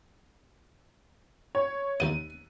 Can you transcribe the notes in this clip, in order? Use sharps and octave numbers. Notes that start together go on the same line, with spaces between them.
C#5
D#2 D#5 D#7